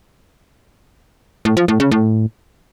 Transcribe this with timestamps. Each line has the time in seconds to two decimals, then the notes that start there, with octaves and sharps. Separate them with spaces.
1.45 A2
1.57 F3
1.68 A2
1.80 C#3
1.91 A2